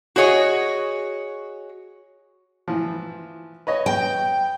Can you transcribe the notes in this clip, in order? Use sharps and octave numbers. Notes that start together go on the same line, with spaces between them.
F#4 G#4 C#5 D#5
E3 F3
B4 C#5 D#5
G5